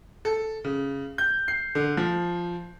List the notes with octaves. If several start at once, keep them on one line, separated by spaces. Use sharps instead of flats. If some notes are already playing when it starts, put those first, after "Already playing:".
A4
C#3
G6
C7
D3
F3